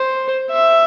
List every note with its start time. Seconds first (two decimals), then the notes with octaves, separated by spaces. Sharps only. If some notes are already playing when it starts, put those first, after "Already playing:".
Already playing: C5
0.51 E5